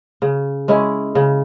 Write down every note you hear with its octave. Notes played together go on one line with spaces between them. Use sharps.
C#3
G#3 C#4 E4
C#3